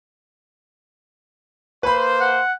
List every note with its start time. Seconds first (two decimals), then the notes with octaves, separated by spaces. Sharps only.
1.83 A#3 B4 C5 B5
2.21 F#5